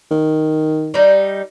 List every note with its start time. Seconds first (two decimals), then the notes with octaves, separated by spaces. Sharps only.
0.11 D#3
0.94 G3 D#4